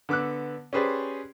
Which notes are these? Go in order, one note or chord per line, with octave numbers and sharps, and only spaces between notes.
D3 B3 D6 E6 F#6
C#4 G4 G#4 B4 C5 D5